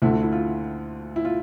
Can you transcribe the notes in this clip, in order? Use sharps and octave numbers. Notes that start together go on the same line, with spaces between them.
D2 D3 A3 E4
E4
E4
F4
E4
F4